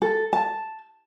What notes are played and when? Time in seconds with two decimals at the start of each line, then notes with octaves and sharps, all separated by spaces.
0.02 A4
0.33 A5